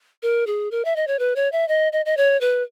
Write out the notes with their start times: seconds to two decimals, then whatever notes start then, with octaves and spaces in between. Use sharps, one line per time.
0.23 A#4
0.47 G#4
0.71 A#4
0.85 E5
0.96 D#5
1.07 C#5
1.19 B4
1.36 C#5
1.52 E5
1.68 D#5
1.93 D#5
2.06 D#5
2.17 C#5
2.41 B4